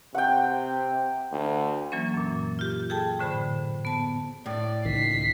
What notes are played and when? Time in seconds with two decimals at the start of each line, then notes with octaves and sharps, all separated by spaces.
0.15 C3 F#5 G5
1.32 D2
1.92 E3 F#3 A#3 C#4
2.14 F#2 A#2
2.59 F4 G4
2.90 G#4 A4 G5 A5
3.19 A2 D3 C5 B5
3.85 B3 A5
4.46 A2 D5
4.85 C#2 D#3 B6 C7